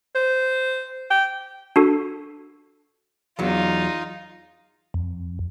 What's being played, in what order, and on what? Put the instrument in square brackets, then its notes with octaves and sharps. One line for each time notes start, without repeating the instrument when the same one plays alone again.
[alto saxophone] C5
G5
[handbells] D4 F#4 A4
[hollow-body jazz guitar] E2 F#3 [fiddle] D#4 F4
[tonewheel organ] F2